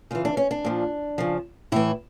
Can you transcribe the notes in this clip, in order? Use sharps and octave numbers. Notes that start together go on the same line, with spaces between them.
C#3 E3 F4
D4
C#4
D4
A#2 F3
C#3 F3
A2 E3 E4